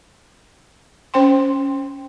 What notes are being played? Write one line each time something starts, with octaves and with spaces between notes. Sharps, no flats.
C#4 C5 G5 C6